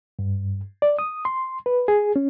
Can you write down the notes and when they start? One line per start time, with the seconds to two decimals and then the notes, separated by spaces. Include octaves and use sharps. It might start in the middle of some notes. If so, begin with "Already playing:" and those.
0.19 G2
0.82 D5
0.99 D#6
1.25 C6
1.66 B4
1.88 G#4
2.16 C#4